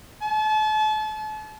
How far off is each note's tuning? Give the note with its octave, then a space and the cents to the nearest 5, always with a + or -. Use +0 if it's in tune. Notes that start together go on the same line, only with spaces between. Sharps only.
A5 -35